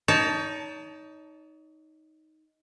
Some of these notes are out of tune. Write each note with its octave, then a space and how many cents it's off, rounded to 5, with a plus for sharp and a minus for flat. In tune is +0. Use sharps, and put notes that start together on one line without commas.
D#4 +10 C#5 +40 A5 +0